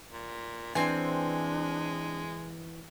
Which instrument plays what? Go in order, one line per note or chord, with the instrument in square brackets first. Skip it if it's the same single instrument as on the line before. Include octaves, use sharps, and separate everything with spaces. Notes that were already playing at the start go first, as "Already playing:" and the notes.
[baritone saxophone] A#2
[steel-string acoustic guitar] E3 [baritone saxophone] G#3 [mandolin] C4 G#5 [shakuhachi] D4